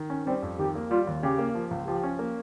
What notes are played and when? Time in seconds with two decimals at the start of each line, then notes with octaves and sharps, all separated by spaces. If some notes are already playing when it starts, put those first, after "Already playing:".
Already playing: D#3
0.10 C#4
0.26 G3 C4
0.42 F2
0.58 D#3 G4
0.75 A#3
0.91 G3 F4
1.07 D#2
1.23 C#3 G4
1.39 A#3
1.55 F3
1.71 C#2
1.87 F3 G4
2.03 C#4
2.19 A#3